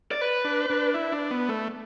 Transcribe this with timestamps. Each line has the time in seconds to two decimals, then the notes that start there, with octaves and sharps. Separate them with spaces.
0.11 D5
0.21 B4
0.45 D4
0.70 D4
0.94 E4
1.12 D4
1.31 B3
1.49 A3